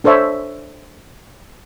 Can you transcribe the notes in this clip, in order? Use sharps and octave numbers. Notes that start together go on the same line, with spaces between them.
D4 A4 C5 C#5 E5